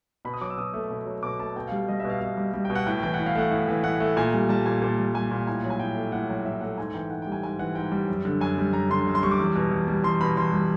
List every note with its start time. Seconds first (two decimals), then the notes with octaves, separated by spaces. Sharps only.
0.25 B2 B5
0.34 D#6
0.41 F#3 D6
0.50 E6
0.58 B2 D#6
0.74 A3
0.90 B2
1.06 F#3
1.23 B2 D6
1.40 A3 A5
1.56 B2 G5
1.67 G3 F5
1.88 G3 D#5
2.00 E5
2.05 B2
2.10 F5
2.21 B2 F5
2.37 G3
2.54 G3
2.65 G5
2.70 B2
2.75 F#5
2.87 A2 G5
3.03 E3 G5
3.14 F#5
3.19 A2
3.26 F5
3.35 A3 F#5
3.51 A2
3.68 E3
3.84 A2 F#5
4.00 A3
4.17 A#2 G#5
4.34 G3
4.49 G3 A5
4.66 A#2 G#5
4.82 A#2 A5
4.98 G3
5.14 G3 G#5
5.31 A#2
5.47 A2 G#5
5.64 F#3
5.70 G#5
5.79 A2 G5
5.96 A3
6.12 A2 F#5
6.29 F#3
6.45 A2 E5
6.61 A3 F#5
6.78 G#2 G#5
6.94 E3 G5
7.10 G#2 F#5
7.22 G3 G5
7.32 G#5
7.43 G#2 G#5
7.59 E3 F#5
7.75 G#2 G5
7.92 G3
8.08 F#2
8.25 D3
8.41 F#2 G#5
8.58 G3
8.73 F#2 A#5
8.90 D3 C6
9.07 F#2
9.15 C6
9.23 G3 C#6
9.31 D6
9.40 E2
9.55 B2
9.71 E2
9.88 G3
10.04 E2 C6
10.21 B2 B5
10.37 E2 C6
10.53 G3